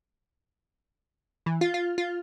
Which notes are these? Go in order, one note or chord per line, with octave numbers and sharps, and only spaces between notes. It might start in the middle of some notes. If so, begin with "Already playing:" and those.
E3
F4
F4
F4